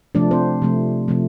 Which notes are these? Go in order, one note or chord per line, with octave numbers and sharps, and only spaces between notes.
C3 F3 A3 D4 D5
C4 C5
C3 F3 A3
C3 F3 A3